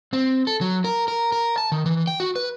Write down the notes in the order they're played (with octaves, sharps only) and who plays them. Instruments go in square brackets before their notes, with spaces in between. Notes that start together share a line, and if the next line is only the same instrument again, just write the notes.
[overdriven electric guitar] C4
A4
F#3
A#4
A#4
A#4
A5
D#3
E3
G5
F#4
B4